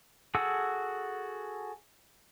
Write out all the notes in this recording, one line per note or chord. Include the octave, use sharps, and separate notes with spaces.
F#4 G#4 A4 F#5 E6